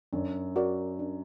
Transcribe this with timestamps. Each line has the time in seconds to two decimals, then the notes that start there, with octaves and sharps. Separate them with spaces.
0.13 F#2 D4
0.56 F#4 A#4 D5
0.99 D4